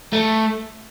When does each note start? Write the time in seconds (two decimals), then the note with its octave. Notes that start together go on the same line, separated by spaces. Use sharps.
0.13 A3